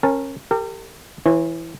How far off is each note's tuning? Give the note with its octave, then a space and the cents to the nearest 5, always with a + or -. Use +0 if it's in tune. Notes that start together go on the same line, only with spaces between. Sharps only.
C#4 -25 A#4 +0 A5 +0
G4 +10 A#4 -40
E3 +0 C#5 -35